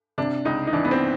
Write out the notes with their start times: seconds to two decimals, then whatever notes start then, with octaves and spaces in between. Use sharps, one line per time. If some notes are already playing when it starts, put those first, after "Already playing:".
0.18 C3 D4
0.45 C#2 D#4
0.67 D#4
0.73 E3 D4
0.85 B3
0.91 C4